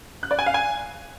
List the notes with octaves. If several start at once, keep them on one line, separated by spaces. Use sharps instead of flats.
F#6
D5
G#5
F5
G#5